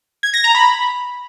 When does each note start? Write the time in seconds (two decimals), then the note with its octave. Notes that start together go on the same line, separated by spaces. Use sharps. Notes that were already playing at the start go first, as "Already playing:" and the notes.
0.23 G#6
0.34 A#6
0.44 A#5
0.55 B5